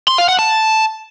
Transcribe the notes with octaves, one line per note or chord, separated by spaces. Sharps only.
C6
F5
F#5
A5